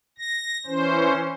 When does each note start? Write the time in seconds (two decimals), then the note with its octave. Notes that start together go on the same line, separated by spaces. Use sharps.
0.18 A#6
0.66 E3 C#4 C5